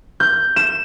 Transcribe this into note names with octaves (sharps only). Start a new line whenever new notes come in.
G6
E7